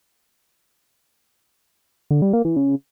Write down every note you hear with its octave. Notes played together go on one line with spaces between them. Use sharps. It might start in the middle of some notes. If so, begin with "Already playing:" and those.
D3
G3
A#3
E3
C#3